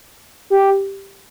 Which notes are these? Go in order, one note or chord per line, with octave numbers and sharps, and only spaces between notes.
G4